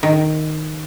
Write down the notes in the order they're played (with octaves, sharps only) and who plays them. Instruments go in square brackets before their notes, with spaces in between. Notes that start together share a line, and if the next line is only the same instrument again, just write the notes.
[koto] D#3